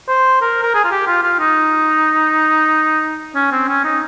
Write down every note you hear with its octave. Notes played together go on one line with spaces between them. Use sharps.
C5
A#4
A#4
G#4
F4
G4
F4
F4
D#4
C#4
C4
C#4
D#4